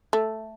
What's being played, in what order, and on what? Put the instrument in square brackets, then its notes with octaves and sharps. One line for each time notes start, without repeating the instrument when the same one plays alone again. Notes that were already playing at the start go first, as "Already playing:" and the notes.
[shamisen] A3